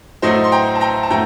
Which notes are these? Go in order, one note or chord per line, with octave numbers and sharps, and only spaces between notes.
A2 F#3 A3 C5 D#5
C6
G5 A#5
A5
G5 A#5
A5
A2 F#3 A3 G5 A#5